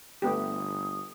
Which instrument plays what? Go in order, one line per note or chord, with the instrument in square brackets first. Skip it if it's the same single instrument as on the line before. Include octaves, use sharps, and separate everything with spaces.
[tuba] G1 [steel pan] A3 B3 G4 [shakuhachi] D#6